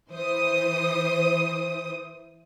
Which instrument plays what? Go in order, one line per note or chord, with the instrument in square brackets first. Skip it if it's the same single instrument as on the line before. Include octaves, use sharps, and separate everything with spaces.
[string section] E3 C5 D#6